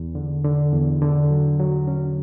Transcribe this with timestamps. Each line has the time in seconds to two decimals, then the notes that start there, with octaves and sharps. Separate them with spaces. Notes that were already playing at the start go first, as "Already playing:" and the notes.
Already playing: E2
0.15 D3
0.44 D3
0.73 E2
1.02 D3
1.30 F#3
1.59 F#3
1.87 C#4